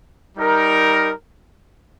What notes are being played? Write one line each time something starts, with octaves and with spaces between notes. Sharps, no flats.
G3 D#4 A#4